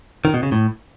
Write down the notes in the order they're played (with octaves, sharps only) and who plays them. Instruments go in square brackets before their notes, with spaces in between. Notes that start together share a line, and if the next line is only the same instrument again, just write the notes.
[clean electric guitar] D#3
B2
C#3
A2